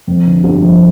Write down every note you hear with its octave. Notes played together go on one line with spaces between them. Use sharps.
F2
D3
G1
F3